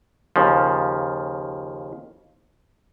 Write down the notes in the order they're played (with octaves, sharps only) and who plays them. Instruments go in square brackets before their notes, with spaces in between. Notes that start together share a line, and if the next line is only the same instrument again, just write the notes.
[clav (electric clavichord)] D#2 C#3 F3